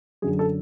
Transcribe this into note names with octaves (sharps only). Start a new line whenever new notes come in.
F#2 D3 F#3 G#4
A4